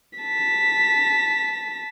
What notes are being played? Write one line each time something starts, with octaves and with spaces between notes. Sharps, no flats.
A5 B6